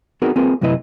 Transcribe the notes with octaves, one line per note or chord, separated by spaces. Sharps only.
B3 C4 D#4 F#4 G#4 A#4
A#3 C4 F4 G#4 A#4 B4
F#2 C3 A3 E4 B4 D#5